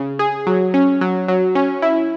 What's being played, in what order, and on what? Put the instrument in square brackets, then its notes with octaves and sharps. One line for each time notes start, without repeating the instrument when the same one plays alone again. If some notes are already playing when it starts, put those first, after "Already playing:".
Already playing: [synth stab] C#3
G#4
F#3
C#4
F#3
F#3
C#4
E4